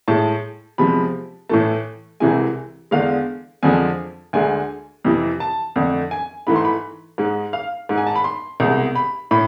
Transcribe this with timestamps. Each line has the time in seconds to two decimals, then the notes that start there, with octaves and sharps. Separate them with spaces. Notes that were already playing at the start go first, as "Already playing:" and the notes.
0.08 A2 G#3 A5
0.78 E2 C3 F3 G#3 B5
1.49 A2 E3 A3 A5
2.20 C2 C3 E3 G#3 G#5
2.91 E2 D3 G#3 F5
3.63 F2 D3 F3 G#3 G#5
4.33 D2 D3 G#3 G#5
5.05 F2 C3 E3
5.40 A5
5.76 F2 D3 A3
6.11 G#5
6.47 G#2 E3 A3 B5
6.56 C6
6.65 B5
7.18 G#2 G#3
7.53 F5
7.89 G#2 G#3
7.98 G#5
8.07 A5
8.15 B5
8.24 C6
8.60 C2 B2 G#3
8.95 B5
9.31 A2 B5